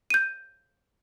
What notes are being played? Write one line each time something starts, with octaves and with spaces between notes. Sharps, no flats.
G6 D#7